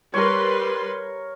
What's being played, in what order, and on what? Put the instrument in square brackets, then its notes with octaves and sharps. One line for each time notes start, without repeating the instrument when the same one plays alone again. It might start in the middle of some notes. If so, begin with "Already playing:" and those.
[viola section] G3 B4 C6 [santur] A#4 C#5